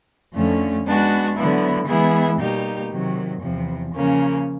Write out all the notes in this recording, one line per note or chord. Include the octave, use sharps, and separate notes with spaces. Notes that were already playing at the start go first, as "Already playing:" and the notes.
F2 D3 F3 A3 C#4
G#3 B3 D4 F#4
D3 F#3 B3 E4
E3 G#3 B3 E4 G#4
B2 G3 A#3 D#4 G4
C3 D#3 F#3
E2 C3 F3
C#3 F3 A#3 C#4